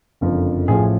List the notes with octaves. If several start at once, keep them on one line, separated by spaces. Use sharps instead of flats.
F#1 F2 D3 F3
A1 A2 F3 G#4